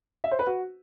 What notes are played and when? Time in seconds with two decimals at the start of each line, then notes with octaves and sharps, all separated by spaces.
0.24 E5
0.31 C5
0.39 B4
0.47 F#4